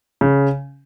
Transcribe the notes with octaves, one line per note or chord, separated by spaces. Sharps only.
C#3